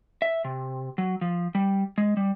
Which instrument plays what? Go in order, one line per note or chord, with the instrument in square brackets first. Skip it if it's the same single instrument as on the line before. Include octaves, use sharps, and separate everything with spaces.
[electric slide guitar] E5
C3
F#3
F3
G3
G#3
G3